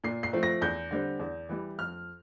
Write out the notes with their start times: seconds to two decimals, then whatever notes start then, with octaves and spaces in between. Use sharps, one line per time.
0.04 A#2 C7
0.23 C7
0.33 F3 A3 C4
0.43 A#6
0.61 E2 G6
0.91 D3 G3 C4
1.19 E2
1.49 E3 G3
1.79 F2 F6